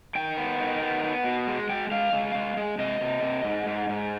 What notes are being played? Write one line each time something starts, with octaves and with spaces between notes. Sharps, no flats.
D#3 G5
B3
D#3
B3
B3
B2
G#3
G#3 G5
G#3 F5
G#3
G#3
G#3
C3 D#5
C3
C3
G#2
G#2
G#2